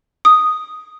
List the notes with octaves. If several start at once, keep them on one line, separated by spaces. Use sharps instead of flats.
D#6